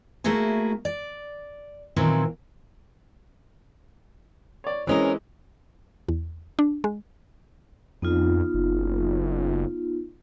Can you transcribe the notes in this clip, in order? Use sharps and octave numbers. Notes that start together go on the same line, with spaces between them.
A3 A#3 E4 F#4 G#4
D5
A#2 D#3 E3 F#3 C4 E4
C#5 D5
E3 G#3 C4 C#4 A#4 D#5
E2
D4
G#3
F2 B3 D#4 F4
F#1